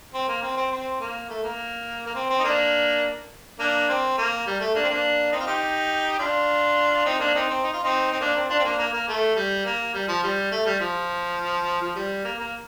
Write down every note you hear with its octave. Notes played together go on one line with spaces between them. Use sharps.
C4
A#3
C4
C4
C4
A#3
A3
A#3
A#3
C4
C4
D#4
A#3 D4
A#3 D4
C4
A#3
G3
A3
A#3 D4
C4
A#3 D4
C4 D#4
F4
D#4 G4
D4 F4
C4 D#4
A#3 D4
C4 D#4
C4
D#4
F4
C4 D#4
C4
A#3 D4
C4
D4 F4
C4
A#3 D4
A#3
A#3
A3
G3
A#3
G3
F3
G3
A3
G3
F3
F3
G3
A#3
A#3